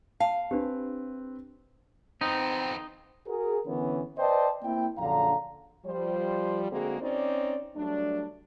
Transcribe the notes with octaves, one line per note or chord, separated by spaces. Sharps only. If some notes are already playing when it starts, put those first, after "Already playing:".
F5 A5 B5
C4 D4 G4 B4 C5
F2 B3 C4 D#4
F#4 G#4 A#4
D3 E3 B3 C#4
B4 C5 D5 D#5 G5 A5
A#3 C4 E4 G5
A#1 F#2 D3 F5 A#5
F3 G3 C5
D3 G#3 A#3 C4 F#4 G#4
C4 C#4 D#4 C5 D5
F#3 G3 A3 D4